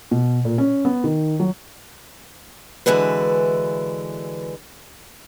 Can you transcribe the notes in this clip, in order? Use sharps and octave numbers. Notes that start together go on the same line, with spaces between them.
B2
A#2
C#4
B3
D#3
F#3
D3 E3 G#3 E4 F#4 B4